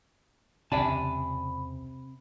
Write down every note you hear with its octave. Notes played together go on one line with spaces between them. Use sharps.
E1 C#2 C3 D5 G#5 A5 B5